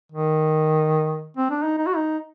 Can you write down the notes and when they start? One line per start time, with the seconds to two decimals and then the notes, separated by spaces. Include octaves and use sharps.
0.12 D#3
1.37 C4
1.51 D4
1.64 D#4
1.78 D#4
1.87 F#4
1.96 D#4